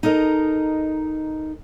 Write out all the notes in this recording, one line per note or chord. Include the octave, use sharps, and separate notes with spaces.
D#4 A4 A#4 D#5